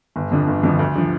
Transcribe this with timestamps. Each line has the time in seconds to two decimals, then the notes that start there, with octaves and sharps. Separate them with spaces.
0.16 G1
0.31 F2 D3 F3
0.48 G1
0.63 F2 D3 F3
0.79 D2
0.95 D3 F3